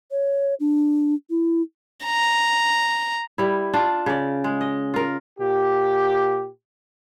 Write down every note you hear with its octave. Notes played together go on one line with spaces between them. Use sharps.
C#5
D4
E4
A#5
G3 E4
D4 F4
C#3 D5
G#3
D#5
F4 A#4
A#2 G4